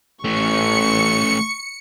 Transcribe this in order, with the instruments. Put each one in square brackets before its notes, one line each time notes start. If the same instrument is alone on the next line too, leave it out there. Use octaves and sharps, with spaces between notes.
[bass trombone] A1 [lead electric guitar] A3 C#4 [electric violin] C#6 [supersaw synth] C#7